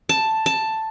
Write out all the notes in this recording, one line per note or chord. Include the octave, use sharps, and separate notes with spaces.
A5
A5